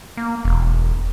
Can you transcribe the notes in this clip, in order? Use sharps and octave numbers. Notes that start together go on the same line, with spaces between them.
A#3
E1